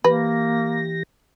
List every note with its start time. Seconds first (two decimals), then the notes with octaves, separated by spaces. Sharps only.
0.04 E3 A#3 G4 B4 A#6